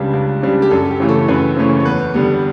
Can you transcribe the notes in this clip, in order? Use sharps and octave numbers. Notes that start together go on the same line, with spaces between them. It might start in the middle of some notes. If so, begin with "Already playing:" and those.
Already playing: C#2 C#3 G3 D4 B4
C#2
C#3 G3 D4
G4
F#2 A4
G4
C#3 E3 A3 C#4
A4
F#2 B4
C#3 E3 A3 C#4
C#5
E2 B4
D3 G3 B3